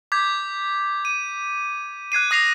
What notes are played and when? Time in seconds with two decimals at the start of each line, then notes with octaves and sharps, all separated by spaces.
0.12 D6 G6 G#6 B6
1.05 D#7
2.12 F#6 G#6 C7 D#7
2.31 D#6 A#6 C7 F7